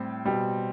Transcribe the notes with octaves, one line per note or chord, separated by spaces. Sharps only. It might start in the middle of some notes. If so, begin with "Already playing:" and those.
Already playing: A2 G3 C4
B2 G3